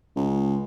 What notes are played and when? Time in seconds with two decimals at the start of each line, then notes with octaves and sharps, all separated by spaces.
0.16 C#2